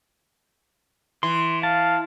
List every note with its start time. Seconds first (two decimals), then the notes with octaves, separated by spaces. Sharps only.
1.23 E3 C6
1.63 F5 A5